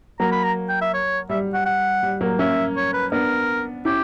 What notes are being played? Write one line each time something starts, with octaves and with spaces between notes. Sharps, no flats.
F#3 A#3 A#5
B5
A#5
G5
E5
C#5
G3 E5
F#5
F#5
G3
F#3 A#3
A#3 C#4 E5
C#5
B4
B3 D4 A#4
C#4 E4 G4